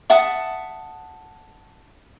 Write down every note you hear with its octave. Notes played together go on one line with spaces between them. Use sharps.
E5 F#5 A5 D#6